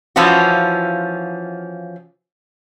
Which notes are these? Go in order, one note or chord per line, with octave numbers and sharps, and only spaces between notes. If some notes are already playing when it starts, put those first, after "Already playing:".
E3 F3 C#4 F4 F#4